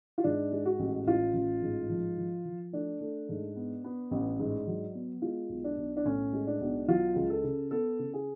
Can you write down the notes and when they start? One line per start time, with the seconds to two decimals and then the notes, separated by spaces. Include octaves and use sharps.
0.18 F4
0.24 G#2 D4
0.52 G#3
0.65 F#4
0.79 A1
1.07 A1 F4
1.34 A1
1.62 G#2
1.89 F3
2.17 F3
2.45 F3
2.73 A3 D4
3.01 A3
3.29 G#2
3.56 B3
3.84 B3
4.11 A1
4.39 G#2
4.67 F#3
4.95 B3
5.22 G#3 F4
5.49 B1
5.64 D4
5.77 B1
5.97 D4
6.05 A2 C#4
6.33 G#3
6.47 D4
6.61 B1
6.88 F#3 F4
7.16 C#2
7.30 A4
7.44 C#3
7.71 B3 A4
7.99 C#3
8.14 G#4